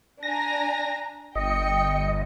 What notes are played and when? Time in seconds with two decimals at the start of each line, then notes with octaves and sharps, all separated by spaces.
0.23 D4 G#5 A#5 A#6
1.35 G1 D#5 G5 C#7